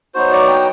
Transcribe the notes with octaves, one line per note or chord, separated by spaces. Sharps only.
F#3 B3 D#4 F#4 C5
D5
G5